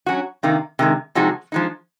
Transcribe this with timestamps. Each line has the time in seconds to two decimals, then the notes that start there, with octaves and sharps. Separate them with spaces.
0.06 F#3 C#4 F#4
0.43 C3 D#3 A#3 D#4
0.79 C3 D#3 G#3
1.15 C3 F3 G#3 D#4 F#4
1.52 F3 G#3 D#4